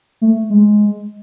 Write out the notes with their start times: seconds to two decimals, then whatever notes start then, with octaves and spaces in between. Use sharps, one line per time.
0.21 A3
0.50 G#3